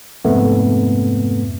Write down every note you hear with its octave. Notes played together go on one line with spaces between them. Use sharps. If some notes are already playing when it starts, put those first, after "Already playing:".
F2 G#2 C3 A3 B3